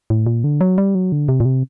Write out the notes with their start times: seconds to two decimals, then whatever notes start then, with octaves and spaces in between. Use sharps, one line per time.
0.10 A2
0.27 A#2
0.44 D3
0.61 F#3
0.78 G3
0.95 F#3
1.12 D3
1.28 C3
1.40 A#2
1.45 C3